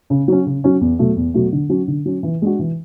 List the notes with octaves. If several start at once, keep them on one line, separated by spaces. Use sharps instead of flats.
C#3
F#3 C#4
C#3
F#3 C#4
E2
B2 F#3 A3
E2
B2 F#3 A3
D3
F#3 C#4
D3
F#3 C#4
E3
G#3 D4 F#4
E3